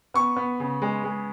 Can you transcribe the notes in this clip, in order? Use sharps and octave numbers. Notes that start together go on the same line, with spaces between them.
B3 C#6
B3
C#3
G#3
G#3